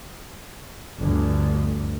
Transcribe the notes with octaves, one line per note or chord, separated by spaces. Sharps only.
G1 D2